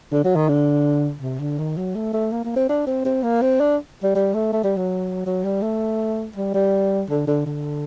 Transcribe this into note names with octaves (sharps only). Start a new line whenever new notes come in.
D3
F#3
D#3
D3
C3
D3
D#3
F#3
A3
A3
A#3
A#3
C4
D4
C4
C4
A#3
C4
D4
G3
G3
A3
A3
G3
F#3
F#3
G3
A3
G3
G3
D3
D3
D3